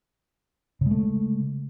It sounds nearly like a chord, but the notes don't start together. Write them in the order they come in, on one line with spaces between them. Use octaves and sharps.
C#3 G#3 A3